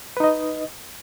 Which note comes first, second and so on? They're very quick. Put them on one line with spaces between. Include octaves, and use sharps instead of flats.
B4 D#4 D#5